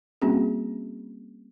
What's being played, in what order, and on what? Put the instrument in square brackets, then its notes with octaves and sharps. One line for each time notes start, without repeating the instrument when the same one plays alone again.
[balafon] G3 A#3 C4 C#4 F#4 G#4